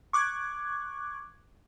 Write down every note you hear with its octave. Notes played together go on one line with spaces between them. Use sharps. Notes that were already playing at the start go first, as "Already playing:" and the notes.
C#6 D6 F#6 G#6